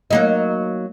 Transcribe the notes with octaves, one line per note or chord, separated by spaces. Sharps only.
F#3 A#3 D#4